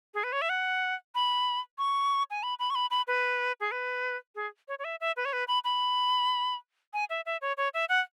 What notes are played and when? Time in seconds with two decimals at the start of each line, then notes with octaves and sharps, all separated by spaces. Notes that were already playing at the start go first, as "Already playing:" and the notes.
0.14 G#4
0.24 B4
0.32 C#5
0.42 E5
0.49 F#5
1.15 B5
1.78 C#6
2.30 G#5
2.43 B5
2.59 B5
2.70 C#6
2.75 B5
2.91 B5
3.07 B4
3.60 G#4
3.72 B4
4.35 G#4
4.68 C#5
4.79 C#5
4.84 E5
5.01 E5
5.17 B4
5.25 C#5
5.33 B4
5.48 B5
5.64 B5
6.93 G#5
7.10 E5
7.26 E5
7.41 C#5
7.57 C#5
7.74 E5
7.89 F#5